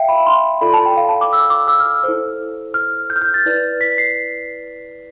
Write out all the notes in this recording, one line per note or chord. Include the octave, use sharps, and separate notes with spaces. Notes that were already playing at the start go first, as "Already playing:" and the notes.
Already playing: E5 F5 G5
B5
C6
F4 A4 D5 B5
A5
G5
F5
A5
D6
E6
D6
E6
F6
E4 A4 C5
F6
G6
F6
G6
A6
E4 B4 D5
B6
C7